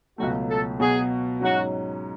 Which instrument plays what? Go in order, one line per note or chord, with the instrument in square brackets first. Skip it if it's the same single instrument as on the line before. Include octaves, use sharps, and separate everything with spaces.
[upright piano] C#2 B2 F#3 A3 [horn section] F#4
[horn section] A4
[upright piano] B2 F#3 B3 F#4 [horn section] G#4
[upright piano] G#2 F#3 C#4 [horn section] F#4